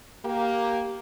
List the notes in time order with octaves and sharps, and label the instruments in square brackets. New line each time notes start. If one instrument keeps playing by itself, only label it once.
[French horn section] A#3 G4